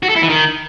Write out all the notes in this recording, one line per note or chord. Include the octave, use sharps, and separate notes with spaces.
F#4
A4
E4
E3
D#3